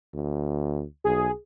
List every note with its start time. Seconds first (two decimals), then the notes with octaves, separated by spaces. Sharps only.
0.14 D2
1.04 B1 G#4